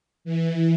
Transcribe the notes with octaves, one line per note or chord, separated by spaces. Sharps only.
E3